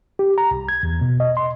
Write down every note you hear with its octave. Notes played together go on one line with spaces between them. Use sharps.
G4
A#5
C2
G#6
E2
B2
D#5
C6